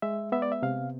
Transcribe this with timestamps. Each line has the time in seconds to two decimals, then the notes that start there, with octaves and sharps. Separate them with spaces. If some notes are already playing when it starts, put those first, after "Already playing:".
0.02 G#3 E5
0.32 B3 E5
0.42 D5
0.52 E5
0.62 C3 F5